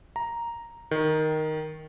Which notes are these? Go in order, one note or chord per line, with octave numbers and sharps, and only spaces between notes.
A#5
D#3